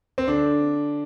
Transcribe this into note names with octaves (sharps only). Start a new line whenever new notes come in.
C4
D3 D4